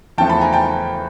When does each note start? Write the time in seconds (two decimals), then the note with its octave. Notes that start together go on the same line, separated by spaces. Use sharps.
0.18 E2 C#3 F3 A3 G5 A5
0.29 A5 B5
0.41 G#5 A#5
0.53 G5 A5